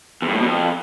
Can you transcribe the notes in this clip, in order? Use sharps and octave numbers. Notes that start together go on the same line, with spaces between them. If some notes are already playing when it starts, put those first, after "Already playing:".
E2
G2
A2
B2
F2